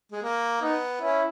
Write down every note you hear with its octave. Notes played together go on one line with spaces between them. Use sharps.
G#3
A#3
B3 D#4
C#4 E4